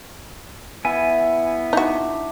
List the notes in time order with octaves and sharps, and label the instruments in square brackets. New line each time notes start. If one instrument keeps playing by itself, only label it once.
[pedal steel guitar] B3 G#5 [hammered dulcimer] E4
[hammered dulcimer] D4 [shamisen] D#4 F#4